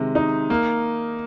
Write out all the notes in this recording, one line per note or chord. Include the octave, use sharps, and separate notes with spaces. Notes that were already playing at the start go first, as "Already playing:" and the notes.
Already playing: C3 D#3 G#3
D#4
A#3